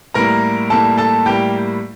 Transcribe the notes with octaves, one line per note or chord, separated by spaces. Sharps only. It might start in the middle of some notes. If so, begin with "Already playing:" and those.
A2 G3 A#3 A#4 A#5
A2 G3 A#3 A4 A5
A4 A5
A2 G3 A#3 G4 G5